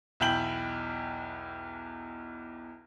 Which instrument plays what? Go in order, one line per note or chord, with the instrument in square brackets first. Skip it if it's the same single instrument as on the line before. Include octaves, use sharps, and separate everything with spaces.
[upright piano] B1 E2 E4 G5 G6 F#7